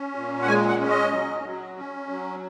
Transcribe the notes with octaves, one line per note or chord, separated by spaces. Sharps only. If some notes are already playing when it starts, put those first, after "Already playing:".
Already playing: C#4
A#2
F#5
G#3 G#5
F#5
C#4
D#5
F#3
F#3
C#4
F#3